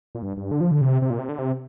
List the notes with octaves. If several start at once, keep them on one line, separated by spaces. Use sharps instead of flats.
A#2
G2
G2
D3
F3
D3
C3
C3
A#2
C3
D3
C3